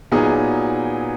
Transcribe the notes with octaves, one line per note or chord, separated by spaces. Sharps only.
A#2 F#3 B3 D#4 G#4